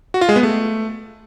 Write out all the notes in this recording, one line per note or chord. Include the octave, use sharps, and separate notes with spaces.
F#4
F4
G#3
B3
A3